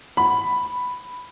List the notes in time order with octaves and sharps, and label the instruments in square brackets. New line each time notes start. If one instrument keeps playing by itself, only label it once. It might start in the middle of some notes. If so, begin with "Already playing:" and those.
[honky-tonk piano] B5